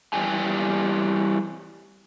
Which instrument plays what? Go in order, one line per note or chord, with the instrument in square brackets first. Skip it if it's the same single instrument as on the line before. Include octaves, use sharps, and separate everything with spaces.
[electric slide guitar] E3 G3 G4 G#5